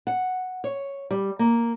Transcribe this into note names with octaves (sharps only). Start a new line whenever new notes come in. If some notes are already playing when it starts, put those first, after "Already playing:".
F#5
C#5
G3
A#3